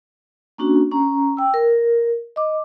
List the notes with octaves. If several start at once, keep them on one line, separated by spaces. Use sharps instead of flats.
A#3 C#4 D4 F#4
C#4 A#5
G5 E6
A#4
D#5 D6